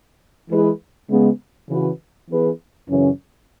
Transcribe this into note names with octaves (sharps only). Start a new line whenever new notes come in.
E3 G#3 E4 G#4 B4
C#3 G#3 B3
C#3 E3 C#4 F#4 B4
E3 B3 G#4 B4
F#2 C#3 E3 C#4